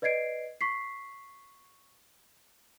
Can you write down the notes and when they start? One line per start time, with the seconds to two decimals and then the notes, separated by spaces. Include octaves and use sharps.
0.02 B4 D5 D#5 G#6 C7 D7
0.61 C#6 B6 C7